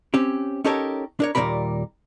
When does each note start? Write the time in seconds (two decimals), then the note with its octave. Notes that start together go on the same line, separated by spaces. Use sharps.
0.14 C4 C#4 G4
0.64 C#4 D#4 G4 A4 A#4 C#5
1.20 D4 A#4 C#5
1.35 D#2 A#2 D#3 G3 A#4 B5